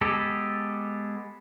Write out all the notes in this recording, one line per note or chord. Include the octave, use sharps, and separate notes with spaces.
G#3 B3 G4 A4